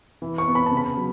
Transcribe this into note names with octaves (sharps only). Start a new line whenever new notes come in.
E3
C#6
B3
B5
A5
C#3
B5
F#3